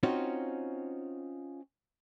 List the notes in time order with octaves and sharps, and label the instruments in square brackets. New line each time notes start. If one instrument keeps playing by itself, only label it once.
[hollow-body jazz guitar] C4 C#4 D#4 F4 F#4